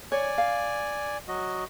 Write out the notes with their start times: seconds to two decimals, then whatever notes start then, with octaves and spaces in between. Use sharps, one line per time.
0.12 C#5 D5 G#5
0.38 F5
1.28 F#3 F#4 D#5